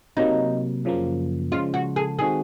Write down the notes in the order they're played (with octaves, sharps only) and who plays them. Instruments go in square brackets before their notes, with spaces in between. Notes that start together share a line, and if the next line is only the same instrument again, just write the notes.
[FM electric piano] C3 F#3 A#3 [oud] D#4
[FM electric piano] F#2 C#3 F3 A#3
[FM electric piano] C#3 F3 G#3 [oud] F4
[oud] F#4
G#4
[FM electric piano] D#3 G#3 C4 F#4 [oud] G#4